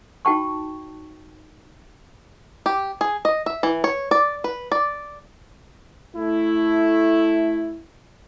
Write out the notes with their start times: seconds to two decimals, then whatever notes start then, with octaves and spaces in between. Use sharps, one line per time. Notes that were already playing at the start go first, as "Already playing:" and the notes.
0.25 D#4 F#4 G5 A5 C#6
2.66 G4
3.01 G#4
3.25 D#5
3.46 E5
3.63 E3
3.84 C#5
4.11 D5
4.44 B4
4.72 D5
6.16 A3 E4